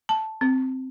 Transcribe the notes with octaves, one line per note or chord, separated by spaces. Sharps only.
A5
C4